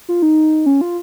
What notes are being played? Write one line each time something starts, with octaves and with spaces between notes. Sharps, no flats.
F4
D#4
C#4
F4